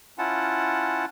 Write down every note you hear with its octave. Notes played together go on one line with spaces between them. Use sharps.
C#4 E4 F4 F#5 A5